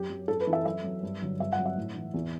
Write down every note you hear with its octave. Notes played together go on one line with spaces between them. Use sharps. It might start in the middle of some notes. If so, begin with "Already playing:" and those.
Already playing: F#2 G4
F#3
F#2 A4
B4
E3
E5
F#2 E5
F#3
G2
D3 F#3
G2 E5
F#5
F#3
E5
A2
E3
E2